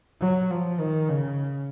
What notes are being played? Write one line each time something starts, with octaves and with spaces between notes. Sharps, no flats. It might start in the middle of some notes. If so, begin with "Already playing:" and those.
F#3
F3
D#3
C#3